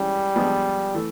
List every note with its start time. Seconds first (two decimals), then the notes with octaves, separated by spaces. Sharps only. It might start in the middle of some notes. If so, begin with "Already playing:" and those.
Already playing: E3 G3 G#3 C#4
0.36 F3 G#3 B3 D4
0.94 E3 A3